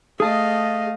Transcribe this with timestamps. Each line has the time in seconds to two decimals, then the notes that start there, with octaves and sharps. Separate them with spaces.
0.20 A3 G#4 D#5 F5 A5